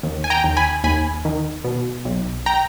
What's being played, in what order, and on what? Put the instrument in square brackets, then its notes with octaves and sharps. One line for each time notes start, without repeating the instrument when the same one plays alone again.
[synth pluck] D#2
G#5
G5 A#5
D#2
G#5 B5
D#2 G#5 B5
D#3
B2
B1
G5 A#5